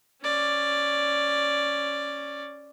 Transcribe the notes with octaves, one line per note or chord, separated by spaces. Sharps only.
C#4 D5